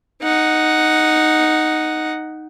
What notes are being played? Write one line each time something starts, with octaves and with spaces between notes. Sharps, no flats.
D#4 F#5